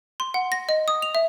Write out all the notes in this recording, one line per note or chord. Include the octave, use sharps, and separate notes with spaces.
C6
F#5
A#6
D#5
D#6
F7
E5